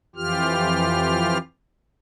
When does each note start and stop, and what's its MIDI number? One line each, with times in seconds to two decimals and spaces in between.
0.16 1.38 41
0.16 1.38 52
0.16 1.38 65
0.16 1.38 67
0.16 1.38 89